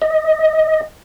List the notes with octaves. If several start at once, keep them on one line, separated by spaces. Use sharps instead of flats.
D#5